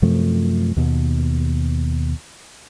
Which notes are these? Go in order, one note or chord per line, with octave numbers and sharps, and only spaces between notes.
F#2 C3 F3 A3
D#2 B2